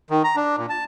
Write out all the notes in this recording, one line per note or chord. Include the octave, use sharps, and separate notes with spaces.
D#3
A#5
D4
A#2
A5